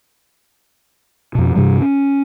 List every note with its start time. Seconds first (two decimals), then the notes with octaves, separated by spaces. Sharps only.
1.35 F2 B2
1.55 G2 C3 E3 G3
1.81 C#4